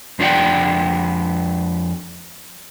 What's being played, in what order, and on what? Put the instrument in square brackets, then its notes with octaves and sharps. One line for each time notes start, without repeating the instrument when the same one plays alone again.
[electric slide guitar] F2 D4 F4 D5 F#5 G5